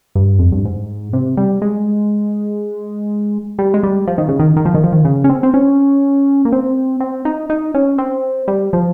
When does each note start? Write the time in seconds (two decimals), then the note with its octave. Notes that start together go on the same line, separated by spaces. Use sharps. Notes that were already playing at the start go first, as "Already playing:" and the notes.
0.15 G2
0.39 F2
0.52 G2
0.65 G#2
1.13 C3
1.37 G3
1.62 G#3
3.59 G3
3.74 G#3
3.83 G3
4.07 F3
4.18 D#3
4.28 C#3
4.39 D#3
4.56 D#3
4.65 F3
4.74 D#3
4.83 F3
4.92 D#3
5.05 C#3
5.24 C#4
5.29 C4
5.43 C4
5.54 C#4
6.45 A#3
6.52 C4
7.00 C4
7.25 D#4
7.50 D#4
7.74 C#4
7.98 C4
8.48 G3
8.73 F3